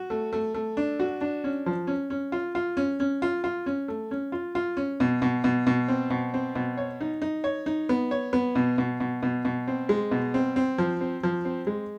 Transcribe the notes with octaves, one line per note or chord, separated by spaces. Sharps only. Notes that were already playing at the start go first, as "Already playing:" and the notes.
Already playing: F#4
A3
A3
A3
D4
F#4
D4
C#4
F3
C#4
C#4
F4
F4
C#4
C#4
F4
F4
C#4
A3
C#4
F4
F4
C#4
B2
B2
B2
B2
C4
B2
C4
B2
C#5
D#4
D#4
C#5
D#4
B3
C#5
B3
B2
B2
B2
B2
B2
C4
G#3
B2
C4
C4
F3
C4
F3
C4
G#3